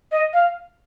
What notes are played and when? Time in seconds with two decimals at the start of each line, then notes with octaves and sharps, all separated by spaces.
0.11 D#5
0.33 F5